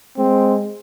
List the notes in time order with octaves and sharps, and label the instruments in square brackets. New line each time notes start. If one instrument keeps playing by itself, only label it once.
[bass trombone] G#3 [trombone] C4